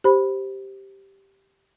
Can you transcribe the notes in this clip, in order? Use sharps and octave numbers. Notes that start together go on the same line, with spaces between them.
G4 C5 B5